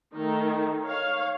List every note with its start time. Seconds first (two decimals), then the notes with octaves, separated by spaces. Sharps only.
0.15 D#3 A3 D#4
0.86 C#5 F5